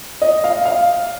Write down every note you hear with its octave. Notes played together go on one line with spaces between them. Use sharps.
D#5
F5
F5